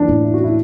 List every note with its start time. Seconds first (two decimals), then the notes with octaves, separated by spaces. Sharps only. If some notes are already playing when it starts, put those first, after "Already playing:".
Already playing: E3 D4
0.09 A2
0.24 E4
0.34 F#4
0.44 E4